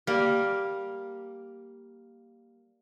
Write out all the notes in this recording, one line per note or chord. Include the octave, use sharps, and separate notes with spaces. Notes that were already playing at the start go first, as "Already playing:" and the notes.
G3 A#3